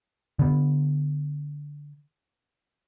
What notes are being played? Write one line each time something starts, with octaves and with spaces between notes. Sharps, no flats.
D3 B3